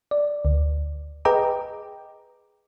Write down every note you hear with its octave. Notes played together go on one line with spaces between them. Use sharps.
D5
D2
G#4 B4 D#5 G5 A#5 D6